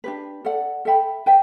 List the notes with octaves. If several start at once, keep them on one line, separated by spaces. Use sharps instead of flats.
D4 G4 B4
A4 D5 F#5
A4 E5 G5 B5
B4 E5 G5